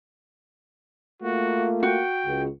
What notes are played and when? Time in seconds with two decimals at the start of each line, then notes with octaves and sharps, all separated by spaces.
1.22 A3 A#3 F4 F#4
1.83 F#4 G5
2.27 C#2